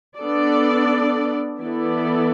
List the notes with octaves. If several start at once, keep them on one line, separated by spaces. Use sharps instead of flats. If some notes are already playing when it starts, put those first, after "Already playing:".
B3 D4 A4 D5
E3 B3 E4 A4 D5